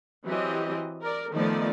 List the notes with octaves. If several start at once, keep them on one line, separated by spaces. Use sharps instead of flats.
E3 F#3 C4 G4 D#5
A#4 D5
D#3 F3 A3 B3 D#4 D5